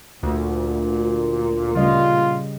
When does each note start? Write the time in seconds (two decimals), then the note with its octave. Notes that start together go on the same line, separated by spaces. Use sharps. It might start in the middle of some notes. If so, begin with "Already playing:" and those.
0.23 D2 A#2
1.75 C#3 G3 F4 D#5